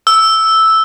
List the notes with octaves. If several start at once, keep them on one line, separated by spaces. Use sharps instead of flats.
E6